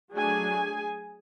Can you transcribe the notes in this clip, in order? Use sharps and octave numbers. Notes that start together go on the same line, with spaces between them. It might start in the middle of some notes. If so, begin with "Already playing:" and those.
F#3 A3 D4 G#4 G#5